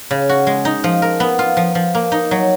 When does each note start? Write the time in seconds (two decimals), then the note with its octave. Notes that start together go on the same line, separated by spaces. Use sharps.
0.11 C#3
0.29 F#4
0.47 G#3
0.65 D#4
0.84 F3
1.02 A#4
1.20 B3
1.39 F4
1.57 F3
1.75 F3
1.95 A#3
2.12 D#4
2.31 F#3